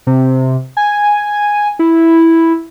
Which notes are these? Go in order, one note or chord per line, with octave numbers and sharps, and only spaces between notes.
C3
G#5
E4